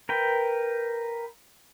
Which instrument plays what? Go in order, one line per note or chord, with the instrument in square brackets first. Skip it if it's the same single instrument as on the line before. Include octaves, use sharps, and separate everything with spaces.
[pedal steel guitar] A#4 B4 G5